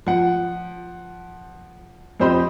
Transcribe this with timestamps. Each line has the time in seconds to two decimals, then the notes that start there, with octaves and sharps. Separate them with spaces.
0.06 F3 F#5
2.20 F2 C4 G4 C5 D#5 B5